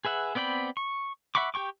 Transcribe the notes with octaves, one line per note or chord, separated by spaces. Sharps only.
G#4 B4 E5 F#5
B3 C4 D5 G5 B5
C#6
E5 F#5 B5 C#6 D6
G4 G5 C#6 D6